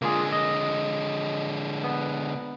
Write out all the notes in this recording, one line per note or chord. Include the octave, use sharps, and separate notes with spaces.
D3 G#3 A#3 F4 G#4
D#5
B3